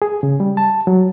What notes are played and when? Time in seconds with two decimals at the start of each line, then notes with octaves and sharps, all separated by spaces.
0.02 G#4
0.23 C#3
0.40 G3
0.57 A5
0.87 F#3